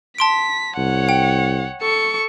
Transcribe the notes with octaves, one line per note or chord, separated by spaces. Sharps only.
A5 C6 B6 D7
C2 C#5 F#5
G5
A4 C#6